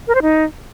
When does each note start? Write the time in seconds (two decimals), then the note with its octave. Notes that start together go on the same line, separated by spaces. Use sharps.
0.08 A#4
0.15 C5
0.22 D#4